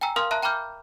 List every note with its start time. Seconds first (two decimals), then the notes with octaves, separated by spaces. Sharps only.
0.01 G5 G#5 A#5 E6
0.16 A#4 F5 C6 D#6 F6
0.31 E5 A5 A#5 F#6
0.43 G5 A#5 B5 D6 F6 G6